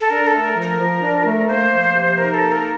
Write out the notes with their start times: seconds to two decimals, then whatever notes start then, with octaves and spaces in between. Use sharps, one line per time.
0.01 A4
0.09 D4 A#4
0.27 A4
0.33 A3
0.44 A#4
0.56 F3
0.62 A#4
0.78 F3
1.01 D4
1.25 A3
1.47 A#3 C5
1.70 F3
1.94 C3
2.17 D#4 A#4
2.34 A4
2.39 A#3
2.52 A#4